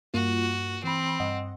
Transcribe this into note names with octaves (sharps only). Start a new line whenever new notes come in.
G2 A#3 F4 F#4
E3 C4 B5
G2 D#5 F#5